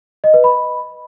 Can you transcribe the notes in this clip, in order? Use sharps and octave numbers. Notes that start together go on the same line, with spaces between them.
D#5
B4
B5